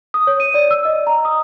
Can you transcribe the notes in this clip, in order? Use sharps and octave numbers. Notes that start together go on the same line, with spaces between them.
D#6
C#5
D#7
D5
E6
D#5
A#5
D#6